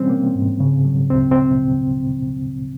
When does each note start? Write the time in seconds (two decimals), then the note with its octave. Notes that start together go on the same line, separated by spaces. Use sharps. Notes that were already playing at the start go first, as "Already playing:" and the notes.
Already playing: E3 G3 C4 C#4
0.10 A#3
0.35 G#2
0.60 C#3
0.85 F#3
1.10 D2 C4
1.31 C4